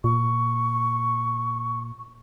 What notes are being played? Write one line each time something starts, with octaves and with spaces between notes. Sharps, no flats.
A#2 C#6